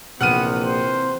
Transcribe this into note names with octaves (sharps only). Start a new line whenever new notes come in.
A#1 C3 E3 B3 F#5 F6 D#7
C5